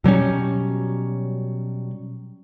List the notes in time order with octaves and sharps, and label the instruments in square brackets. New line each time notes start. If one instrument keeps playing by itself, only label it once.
[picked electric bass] B2 F#3 G3 C#4